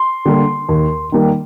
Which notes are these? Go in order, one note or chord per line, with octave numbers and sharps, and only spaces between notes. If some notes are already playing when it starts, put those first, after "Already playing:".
Already playing: C6
D3 G3 A#3
D#2
D#3 G3 A#3